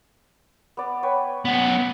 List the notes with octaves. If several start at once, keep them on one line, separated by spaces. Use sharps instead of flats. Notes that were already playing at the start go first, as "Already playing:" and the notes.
B3 D5
B4 C#5 G5
B3 C#4 F#5